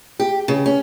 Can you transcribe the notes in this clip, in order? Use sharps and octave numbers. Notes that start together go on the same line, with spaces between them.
G4
C#3
C#4